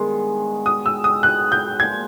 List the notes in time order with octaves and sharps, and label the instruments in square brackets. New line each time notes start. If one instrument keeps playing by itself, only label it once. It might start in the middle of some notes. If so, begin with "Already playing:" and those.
Already playing: [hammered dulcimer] G2 D#3 G#3 B3 [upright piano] C6
[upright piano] D#6
E6
D#6
F#6
G6
[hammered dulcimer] A#2 F3 G#3 [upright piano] G#6